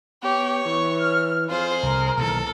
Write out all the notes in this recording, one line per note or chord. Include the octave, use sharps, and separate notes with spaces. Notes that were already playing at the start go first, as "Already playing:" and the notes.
B3 G4 C#5
E3 C#6
F6
F2 F4 G#4 C5
C2 A#4
B1 E2 A#2 D#3 A4